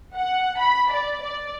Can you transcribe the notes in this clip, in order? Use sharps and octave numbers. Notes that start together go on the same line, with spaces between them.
F#5
B5
D5
D5